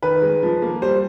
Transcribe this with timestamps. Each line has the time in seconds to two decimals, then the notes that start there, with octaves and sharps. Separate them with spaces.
0.03 D#3 B4
0.22 G#3
0.43 F3
0.62 A#3
0.82 G3 C5